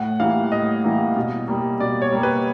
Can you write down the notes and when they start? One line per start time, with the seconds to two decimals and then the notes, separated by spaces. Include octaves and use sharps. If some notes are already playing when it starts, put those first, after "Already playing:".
Already playing: A2 F#5
0.20 E3 G3 A#3 F5
0.52 A2 D#5
0.84 E3 G3 A#3
1.16 B2
1.48 G3 A#3
1.80 B2 D5
2.02 C#5
2.12 G3 A#3
2.23 B4